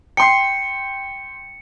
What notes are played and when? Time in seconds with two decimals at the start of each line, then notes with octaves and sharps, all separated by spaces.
0.17 G5 C6 C7 C#7